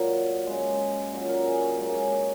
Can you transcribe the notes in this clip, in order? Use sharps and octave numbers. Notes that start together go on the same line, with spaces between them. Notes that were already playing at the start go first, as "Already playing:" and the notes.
Already playing: A#2 F#3 A#4
C#3 G#3
A#2 F#3
A#4
G#4
C#5
C#3 G#3 A#4
A#3
C#4
A#3